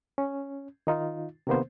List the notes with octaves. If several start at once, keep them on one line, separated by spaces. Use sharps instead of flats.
C#4
D#3 D#4 F4
C3 D#3 A#3 B3 C5